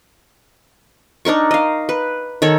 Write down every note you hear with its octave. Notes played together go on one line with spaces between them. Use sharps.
D4 D#4 A#4 C#6
D#5 F5
B4
D#3 A4 C#5